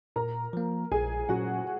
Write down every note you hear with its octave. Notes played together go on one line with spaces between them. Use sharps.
A#2 A#4 A#5
F3 A#3
A#1 G#4 G#5
A#2 F#3 C#4 F#4 F#5